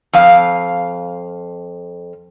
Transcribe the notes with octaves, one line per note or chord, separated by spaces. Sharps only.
F2 F5